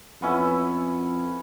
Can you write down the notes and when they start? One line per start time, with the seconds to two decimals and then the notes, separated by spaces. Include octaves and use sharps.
0.22 F2 B3 C#4 E4